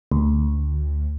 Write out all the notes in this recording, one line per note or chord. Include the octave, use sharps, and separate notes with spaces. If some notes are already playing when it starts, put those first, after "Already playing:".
D2